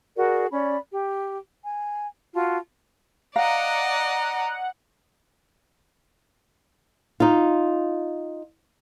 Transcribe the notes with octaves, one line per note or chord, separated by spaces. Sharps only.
F#4 G#4 A#4 D5
C#4 D5 B5
G4
G#5
F4 F#4 A5
D5 D#5 F5 F#5 A#5
D#4 F4